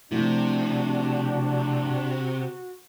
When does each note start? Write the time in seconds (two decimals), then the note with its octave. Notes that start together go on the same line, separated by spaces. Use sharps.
0.12 C3 F3 A3 D4 E4 F#4